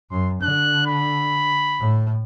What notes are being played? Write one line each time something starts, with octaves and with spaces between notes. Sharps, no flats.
F#2 C6
D3 F#6
B5
A2